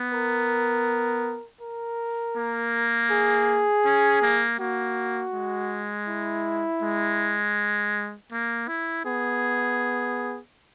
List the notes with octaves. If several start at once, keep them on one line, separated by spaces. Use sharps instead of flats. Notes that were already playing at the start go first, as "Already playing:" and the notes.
Already playing: B3
A#4
A#4
A#3
G#4
C#4
A#3
A#3 F#4
G#3
E4
G#3
A#3
E4
B3 G#4